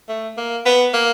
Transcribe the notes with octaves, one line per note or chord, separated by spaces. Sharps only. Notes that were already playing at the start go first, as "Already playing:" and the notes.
A3
A#3
B3
A#3